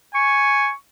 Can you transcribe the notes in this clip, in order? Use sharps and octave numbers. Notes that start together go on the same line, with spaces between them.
G#5 C#6